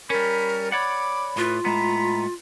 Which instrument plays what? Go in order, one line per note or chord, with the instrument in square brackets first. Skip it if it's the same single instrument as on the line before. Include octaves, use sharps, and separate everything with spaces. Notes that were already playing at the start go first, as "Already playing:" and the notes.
[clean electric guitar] G3 C#4 [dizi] A#4 [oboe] B5
[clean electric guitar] C#5 D5 F#5 [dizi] B5 [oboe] D6
[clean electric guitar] A2 [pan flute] F4 [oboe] B4
[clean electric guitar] A2 G#3 B3 [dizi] A#5 [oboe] B5